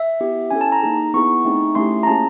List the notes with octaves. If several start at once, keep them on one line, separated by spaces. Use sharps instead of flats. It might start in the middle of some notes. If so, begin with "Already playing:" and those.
Already playing: E5
B3 E4 G4
C#4 E4 A4 G#5
A5
A#5
A#3 D#4 G#4
B3 E4 G#4 C#6
A3 C4 D#4 G#4
A3 C#4 E4 G4 C6
A#5
A#3 C#4 F4 G#4 A5